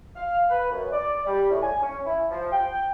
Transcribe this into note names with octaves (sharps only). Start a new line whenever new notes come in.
F5
B4
F#2
D5
G3
A2
G#5
C#4
E4
F3
G5